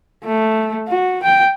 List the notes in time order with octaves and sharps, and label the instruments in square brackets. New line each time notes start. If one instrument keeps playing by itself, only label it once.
[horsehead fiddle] A3
F#4
G5